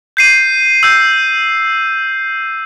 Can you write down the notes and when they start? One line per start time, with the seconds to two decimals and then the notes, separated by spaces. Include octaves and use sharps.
0.17 G6 C7 D#7
0.83 E6 G6